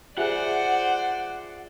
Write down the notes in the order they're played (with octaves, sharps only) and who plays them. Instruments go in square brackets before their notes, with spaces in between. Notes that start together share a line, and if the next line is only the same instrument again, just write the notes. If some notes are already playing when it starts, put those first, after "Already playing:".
[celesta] F4 E5 G#5 [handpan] G4 G#4 [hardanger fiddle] C5 D5 [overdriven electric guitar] F#5